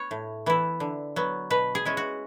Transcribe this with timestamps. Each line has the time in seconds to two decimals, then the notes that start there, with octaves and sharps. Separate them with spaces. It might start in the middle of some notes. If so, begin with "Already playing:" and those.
Already playing: B3 C#5
0.11 A2
0.46 E3 B3 E4
0.80 D3
1.16 F#3 B3
1.50 B2 B4
1.75 G#4
1.85 G#3 C#4 E4
1.97 F#4